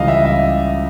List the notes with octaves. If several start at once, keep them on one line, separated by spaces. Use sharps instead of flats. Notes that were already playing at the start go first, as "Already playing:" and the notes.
Already playing: C#2 C#3 E3 G3 D#5 F5
E5
E5